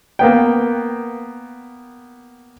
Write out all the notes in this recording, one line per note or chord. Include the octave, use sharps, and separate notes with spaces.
A#3 B3 G5